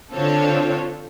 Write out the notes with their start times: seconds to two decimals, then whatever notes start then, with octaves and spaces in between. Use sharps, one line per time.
0.14 D3 C4 D4 F4 A4 C#5